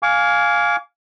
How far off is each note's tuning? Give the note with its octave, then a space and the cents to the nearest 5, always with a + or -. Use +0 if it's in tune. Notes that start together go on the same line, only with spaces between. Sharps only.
F5 +10 G#5 +0 D6 -35